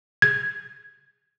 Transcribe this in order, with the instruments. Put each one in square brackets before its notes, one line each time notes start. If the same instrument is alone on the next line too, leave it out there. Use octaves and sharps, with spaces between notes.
[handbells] G#6